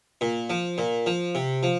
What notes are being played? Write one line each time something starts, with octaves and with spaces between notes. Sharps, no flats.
A#2
F3
A#2
F3
C3
F3